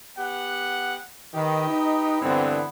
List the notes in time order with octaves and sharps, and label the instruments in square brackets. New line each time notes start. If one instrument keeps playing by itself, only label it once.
[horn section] B3 G4 F#5
[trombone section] D#3 [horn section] G4 B4 D#5
[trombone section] D#4
[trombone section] G2 D3 C4 [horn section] E3 B3